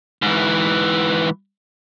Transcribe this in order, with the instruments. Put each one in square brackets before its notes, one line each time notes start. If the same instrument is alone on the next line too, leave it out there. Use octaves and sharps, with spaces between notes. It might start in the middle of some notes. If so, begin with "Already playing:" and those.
[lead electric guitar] G#2 E3